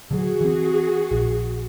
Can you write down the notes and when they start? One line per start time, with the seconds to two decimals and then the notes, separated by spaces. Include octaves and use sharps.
0.11 D3 F3 F#3 F#4 G#4
0.41 E3 C4
1.11 A#1